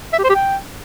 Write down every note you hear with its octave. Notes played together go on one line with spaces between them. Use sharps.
E5
G4
C5
G4
G5